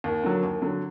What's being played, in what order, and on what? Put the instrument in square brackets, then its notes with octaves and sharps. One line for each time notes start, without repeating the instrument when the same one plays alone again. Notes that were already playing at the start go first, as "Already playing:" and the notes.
[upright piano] D#2 [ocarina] A#4
[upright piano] D3 F#3
D#2
D3 F#3